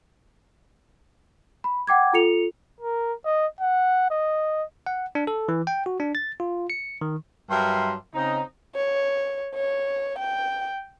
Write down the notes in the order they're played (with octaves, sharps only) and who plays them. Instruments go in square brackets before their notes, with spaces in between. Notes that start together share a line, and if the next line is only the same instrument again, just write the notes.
[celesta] B5
F#5 G5 D6 G#6
F4 A4 C#7 F7
[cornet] A#4
D#5
F#5
D#5
[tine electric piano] F#5
D4
A4
E3
G5
F#4
D4
A6
F4
C#7
D#3
[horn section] G2 F#3 A#4 E5 C6
C#3 C4 D#4
[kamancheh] C#5
C#5
G5